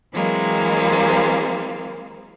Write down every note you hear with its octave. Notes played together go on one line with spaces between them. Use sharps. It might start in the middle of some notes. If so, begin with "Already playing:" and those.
E3 F#3 G#3 A#3 C4